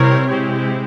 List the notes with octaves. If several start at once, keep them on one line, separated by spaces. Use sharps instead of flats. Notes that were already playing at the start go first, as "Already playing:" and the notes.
Already playing: C3 G3 C4 E4 A#4 C#5
G#3 C4 E4 G4